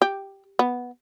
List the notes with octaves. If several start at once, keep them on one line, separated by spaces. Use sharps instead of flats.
G4
B3